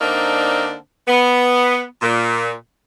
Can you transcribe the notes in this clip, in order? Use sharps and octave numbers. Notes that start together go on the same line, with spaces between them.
D3 A#3 C4 D4 D#4
B3
A#2